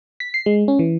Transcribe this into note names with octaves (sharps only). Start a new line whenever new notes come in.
B6
C7
G#3
C#4
E3